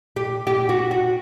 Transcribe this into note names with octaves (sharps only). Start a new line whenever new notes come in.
G4
G4
F#4
F#4